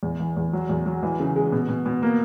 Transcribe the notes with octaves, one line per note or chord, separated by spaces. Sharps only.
E2
E3
E2
F#3
E2
F#3
E3
C#3
G#3
B2
B2
B2
A#3